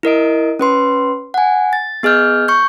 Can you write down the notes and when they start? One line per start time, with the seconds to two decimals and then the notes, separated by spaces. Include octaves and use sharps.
0.03 E4 A#4 D#5 D7
0.59 C#4 B4 C6
1.34 F#5 G#5
1.73 A6
2.03 B3 G#4 D#5 F6 G6
2.48 C#6 G6